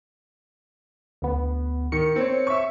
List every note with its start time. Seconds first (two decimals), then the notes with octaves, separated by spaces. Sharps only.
1.22 D2 B3
1.92 D#3 C#7
2.16 C4 C#5
2.47 E5 C#6